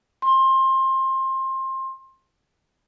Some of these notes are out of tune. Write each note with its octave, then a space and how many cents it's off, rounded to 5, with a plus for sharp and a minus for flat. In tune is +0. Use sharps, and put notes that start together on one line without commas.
C6 +25